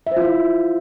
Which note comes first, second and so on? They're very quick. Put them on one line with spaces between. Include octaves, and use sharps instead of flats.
E5 C5 F4 E4